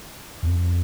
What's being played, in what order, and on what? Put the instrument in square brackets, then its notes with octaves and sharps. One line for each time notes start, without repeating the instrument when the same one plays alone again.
[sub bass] F2